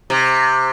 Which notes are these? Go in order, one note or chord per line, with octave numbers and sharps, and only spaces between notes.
C3